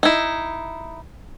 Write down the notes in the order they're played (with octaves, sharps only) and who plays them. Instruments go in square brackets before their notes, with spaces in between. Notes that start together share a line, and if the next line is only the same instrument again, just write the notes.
[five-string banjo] D#4 E4